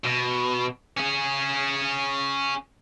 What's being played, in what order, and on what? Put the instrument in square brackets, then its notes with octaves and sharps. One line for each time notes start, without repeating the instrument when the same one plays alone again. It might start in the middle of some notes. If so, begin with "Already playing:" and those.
[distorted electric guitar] B2
C#4 G#4